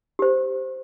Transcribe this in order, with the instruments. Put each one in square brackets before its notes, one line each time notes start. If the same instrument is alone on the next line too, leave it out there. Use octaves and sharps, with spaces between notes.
[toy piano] G4 C5